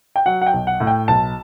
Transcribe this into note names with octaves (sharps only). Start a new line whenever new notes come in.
G5
F#3 F#5
F#5
G5
B1
F#5
A2
G5
B1 A5